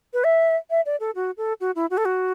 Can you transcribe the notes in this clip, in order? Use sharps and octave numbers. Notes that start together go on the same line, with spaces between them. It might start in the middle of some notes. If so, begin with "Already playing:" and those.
B4
E5
E5
D5
A4
F#4
A4
F#4
E4
F#4
A4
F#4